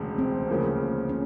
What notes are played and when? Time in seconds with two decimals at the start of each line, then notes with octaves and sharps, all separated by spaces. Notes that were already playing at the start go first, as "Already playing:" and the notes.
Already playing: E1 D2 C#3
0.18 C4
0.48 D2 C#3 F3 A#3
1.09 C#4